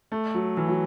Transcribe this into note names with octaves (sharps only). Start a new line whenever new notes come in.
A3
F#3
E3
F#3